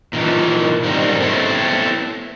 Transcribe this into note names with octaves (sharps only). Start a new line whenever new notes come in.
A#2 D#3 E3
G#2 D#3 G3 C4 D#4
A3 B3 C4 E4 B4 C#5